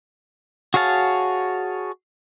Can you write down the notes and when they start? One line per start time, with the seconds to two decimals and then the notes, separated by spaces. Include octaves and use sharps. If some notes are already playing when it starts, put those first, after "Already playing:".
0.74 F#4 G#4 C#5 F5 A5